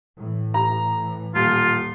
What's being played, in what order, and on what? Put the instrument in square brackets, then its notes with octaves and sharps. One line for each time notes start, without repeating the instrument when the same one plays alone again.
[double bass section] A2 E3
[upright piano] A#5
[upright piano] D#1 [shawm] F4